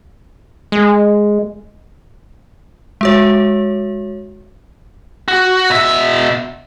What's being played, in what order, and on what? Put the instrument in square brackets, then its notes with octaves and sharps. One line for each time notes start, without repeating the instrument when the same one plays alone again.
[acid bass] G#3
[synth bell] G#3 F#4 C#5
[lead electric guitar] F#4
B2 E5